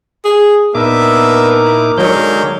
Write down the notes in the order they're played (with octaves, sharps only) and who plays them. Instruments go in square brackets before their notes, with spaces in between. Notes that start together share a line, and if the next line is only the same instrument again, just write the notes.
[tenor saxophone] G#4
[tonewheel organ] A#2 D#4 D6 [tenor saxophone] B3 [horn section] D4 E5 [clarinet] A#4
[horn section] E4
[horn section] B2 D#3 A#3 [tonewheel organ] D3 G#3 G6 [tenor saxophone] F#3